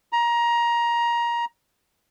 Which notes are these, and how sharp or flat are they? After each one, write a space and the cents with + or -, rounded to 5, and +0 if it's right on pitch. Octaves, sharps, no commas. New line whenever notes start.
A#5 +20